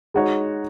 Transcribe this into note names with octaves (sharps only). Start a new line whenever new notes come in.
G#3 D#4 F#4 C#5